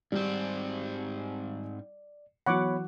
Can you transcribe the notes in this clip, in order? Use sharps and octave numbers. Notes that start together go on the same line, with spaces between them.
G#2 G3 C4 D5
E3 F#3 B3 C#5 F#5 B5 C#6 D6